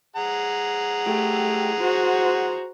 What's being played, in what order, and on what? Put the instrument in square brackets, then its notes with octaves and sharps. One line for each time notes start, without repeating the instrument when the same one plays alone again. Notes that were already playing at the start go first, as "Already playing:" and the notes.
[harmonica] G#4 F#5 A#5
[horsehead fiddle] A3 G4
F#4 C5